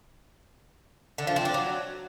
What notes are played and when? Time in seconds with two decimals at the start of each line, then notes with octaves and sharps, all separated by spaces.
1.18 D3
1.27 F3
1.36 C4
1.45 D4
1.54 F#3